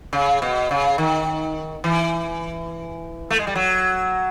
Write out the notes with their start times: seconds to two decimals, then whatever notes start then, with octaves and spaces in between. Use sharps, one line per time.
0.13 C#3
0.42 B2
0.71 C#3
0.98 D#3
1.84 E3
3.30 A3
3.39 G#3
3.47 G3
3.55 F#3